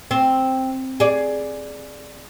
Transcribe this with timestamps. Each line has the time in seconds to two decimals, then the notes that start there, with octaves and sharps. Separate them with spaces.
0.11 C4
1.00 G#4 D5